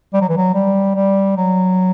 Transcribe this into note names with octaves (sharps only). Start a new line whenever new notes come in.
G3
F#3
E3
F#3
G3
G3
F#3